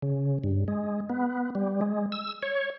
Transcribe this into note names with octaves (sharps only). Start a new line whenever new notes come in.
C#3
G2
G#3
B3
G3
G#3
E6
C#5